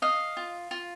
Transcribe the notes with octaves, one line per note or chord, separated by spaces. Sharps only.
D#5 F5
F4
F4